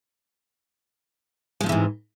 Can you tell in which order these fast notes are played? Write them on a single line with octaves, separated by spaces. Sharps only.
G#3 F3 C3 E3 G#2